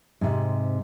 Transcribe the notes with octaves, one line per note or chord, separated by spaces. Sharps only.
G#2 C3